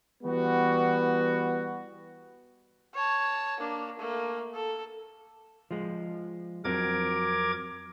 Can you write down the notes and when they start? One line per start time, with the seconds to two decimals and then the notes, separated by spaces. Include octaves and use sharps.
0.23 E3 G3 B3 F#4
2.94 C#5 A5
3.60 A#3 D4
3.99 A3 A#3
4.55 A4
5.71 F3 G#3
6.64 F2 F#3 C4 A#4 D6 G#6